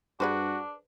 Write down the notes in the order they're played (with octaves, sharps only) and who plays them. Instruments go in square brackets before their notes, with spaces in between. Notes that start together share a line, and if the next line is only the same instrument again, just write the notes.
[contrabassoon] G2 [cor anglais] D4 [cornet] F#4 [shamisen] G#4 B4 C5